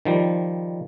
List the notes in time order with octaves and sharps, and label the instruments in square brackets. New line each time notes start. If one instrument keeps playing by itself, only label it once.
[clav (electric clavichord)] D#3 F3 G3